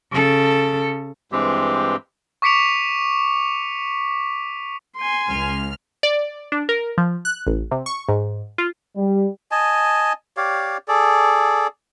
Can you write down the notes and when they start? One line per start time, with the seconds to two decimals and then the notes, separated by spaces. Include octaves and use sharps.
0.12 C#3 A4
1.32 G2 E3 G#3 C4 G4
2.42 C#6 D6 B6 C#7 D7 F7
4.97 G#5 C6
5.29 C#2 F6
6.03 D5
6.52 D4
6.69 A#4
6.98 F3
7.25 F#6
7.47 A1
7.71 C3
7.86 C#6
8.08 G#2
8.58 F4
8.96 G3
9.51 D#5 G#5 A5
10.37 G4 C#5 D5 F5
10.88 G#4 A4 D5